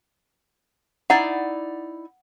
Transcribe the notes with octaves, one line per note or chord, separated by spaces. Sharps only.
D#4 E4 D5 F#5